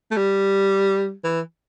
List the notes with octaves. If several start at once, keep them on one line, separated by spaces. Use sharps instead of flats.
A3
G3
E3